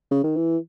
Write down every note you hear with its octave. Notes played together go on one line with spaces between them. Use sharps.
C#3
D#3
E3